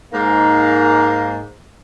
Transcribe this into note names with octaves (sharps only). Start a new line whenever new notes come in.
G#2 A#3